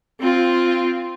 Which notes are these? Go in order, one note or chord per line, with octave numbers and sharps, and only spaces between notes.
C4 F4